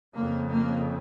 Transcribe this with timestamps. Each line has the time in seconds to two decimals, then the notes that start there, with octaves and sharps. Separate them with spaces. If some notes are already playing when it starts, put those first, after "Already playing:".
0.15 F2 C#3 A#3
0.51 A#3